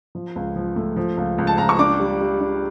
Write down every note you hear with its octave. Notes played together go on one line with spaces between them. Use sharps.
F3
C#2
F3
A3
F3
C#2
C#2
A5
C#2 A#5
C#6
D4 D6
G3
G3
D4